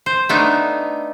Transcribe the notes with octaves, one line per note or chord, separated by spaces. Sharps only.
C5
A3 B3 D4 D#4